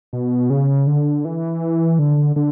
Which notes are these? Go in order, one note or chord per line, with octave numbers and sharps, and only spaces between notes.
B2
C#3
D3
E3
D3
D3